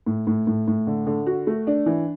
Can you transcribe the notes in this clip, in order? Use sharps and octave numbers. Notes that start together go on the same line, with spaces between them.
A2
A2
A2
A2
D3
D3
F#4
A3
D4
E3